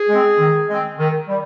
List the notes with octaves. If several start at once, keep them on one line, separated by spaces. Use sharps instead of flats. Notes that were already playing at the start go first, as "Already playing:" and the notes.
Already playing: G#4
G#3 C4
D#3
G#3 C4
D#3
G3